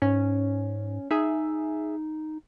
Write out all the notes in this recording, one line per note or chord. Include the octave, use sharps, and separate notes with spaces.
G#2 C#4
D#4 G#4 E5